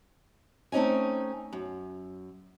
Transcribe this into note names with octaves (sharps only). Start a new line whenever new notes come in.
A3 C4 C#4 D#4 G#5
F#2